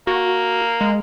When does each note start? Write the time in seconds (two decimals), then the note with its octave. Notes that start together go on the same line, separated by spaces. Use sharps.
0.07 A#3 F#4
0.81 G#3